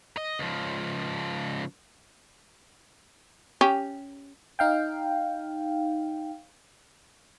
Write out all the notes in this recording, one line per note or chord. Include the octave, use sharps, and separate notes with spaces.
D#5
C#2 F3
C#4 G4
D#4 F5 G5